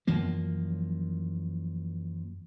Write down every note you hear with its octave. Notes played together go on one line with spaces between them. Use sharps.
F#2 E3 F3 A#3